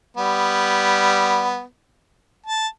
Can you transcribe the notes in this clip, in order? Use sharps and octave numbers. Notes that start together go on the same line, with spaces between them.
G3 B3
A5